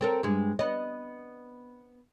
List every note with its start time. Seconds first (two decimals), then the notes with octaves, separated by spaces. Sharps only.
0.01 C4 A4 A#4
0.23 G2 G#3
0.59 B3 D#5